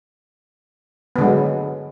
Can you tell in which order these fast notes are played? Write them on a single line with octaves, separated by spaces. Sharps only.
B3 D3 G#3 F#3